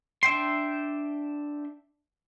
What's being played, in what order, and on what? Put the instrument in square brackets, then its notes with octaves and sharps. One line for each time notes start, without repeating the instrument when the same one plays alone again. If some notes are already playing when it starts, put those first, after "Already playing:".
[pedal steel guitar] D4 E5 G5 C6